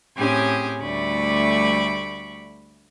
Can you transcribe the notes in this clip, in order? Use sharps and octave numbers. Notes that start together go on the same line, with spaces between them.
A2 C4 C#4 G4 G#4 G#5
D2 G3 A3 B5 C#6 D6